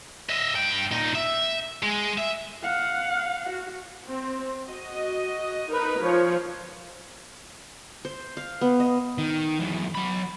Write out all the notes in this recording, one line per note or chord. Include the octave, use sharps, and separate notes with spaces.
D#5 E5
G2 G5
A#2 D#4
E5
G#3
E5
F5 F#5
F#4
C4
F#4 D#5
D#4 A#4 B4
F3 C#5
C5
F5
B3
D#5
D#3
F#2 E3
F#3 B5